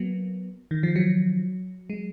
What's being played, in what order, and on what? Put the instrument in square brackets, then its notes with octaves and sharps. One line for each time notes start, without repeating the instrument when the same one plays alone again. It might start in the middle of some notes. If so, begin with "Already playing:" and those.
Already playing: [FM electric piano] F#3 A#3 B3
D#3
F3
F#3
G#3